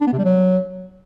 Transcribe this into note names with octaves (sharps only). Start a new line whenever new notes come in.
D4
B3
C3
G3
F#3